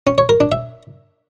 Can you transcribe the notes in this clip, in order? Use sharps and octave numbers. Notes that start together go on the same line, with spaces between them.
C#4
C#5
A#4
D4
E5